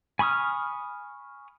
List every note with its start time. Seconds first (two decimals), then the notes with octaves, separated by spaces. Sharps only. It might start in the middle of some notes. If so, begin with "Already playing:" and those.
0.19 G#5 B5 C#6 D#6 F6